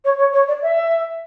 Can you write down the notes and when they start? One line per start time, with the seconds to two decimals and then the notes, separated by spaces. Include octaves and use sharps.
0.05 C#5
0.18 C#5
0.33 C#5
0.48 D5
0.62 E5